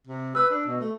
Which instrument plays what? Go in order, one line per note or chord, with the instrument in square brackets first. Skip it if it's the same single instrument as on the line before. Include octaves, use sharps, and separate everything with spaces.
[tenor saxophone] C3
[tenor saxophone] B4 [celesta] E6
[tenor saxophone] D4
B2
A3